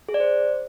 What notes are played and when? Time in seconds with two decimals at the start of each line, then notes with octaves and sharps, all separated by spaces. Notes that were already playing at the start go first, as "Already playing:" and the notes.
0.09 G#4
0.14 D5
0.20 C5